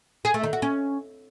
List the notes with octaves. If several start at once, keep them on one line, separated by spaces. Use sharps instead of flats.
G#4
A3
D#3
F#4
C#4